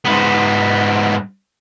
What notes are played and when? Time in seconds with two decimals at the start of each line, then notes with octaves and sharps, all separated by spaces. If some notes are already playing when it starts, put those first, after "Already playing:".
0.05 G#2 B3